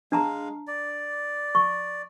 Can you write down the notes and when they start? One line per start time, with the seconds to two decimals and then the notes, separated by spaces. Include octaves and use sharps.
0.12 G#3 D4 F5 A5 A#5
0.67 D5
1.55 C#6